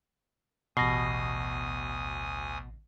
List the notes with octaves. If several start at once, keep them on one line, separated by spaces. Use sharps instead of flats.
A1 D2 B2 G#5 D#6 A#6 C7